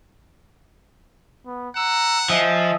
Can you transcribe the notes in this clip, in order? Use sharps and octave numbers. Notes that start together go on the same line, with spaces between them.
B3
F#5 A#5 E6
F3 D#5 E5 G#5